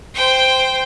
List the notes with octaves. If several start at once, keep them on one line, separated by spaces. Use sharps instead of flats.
C5 G5